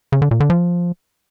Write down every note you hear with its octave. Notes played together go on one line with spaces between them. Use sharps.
C#3
D3
A#2
D3
F3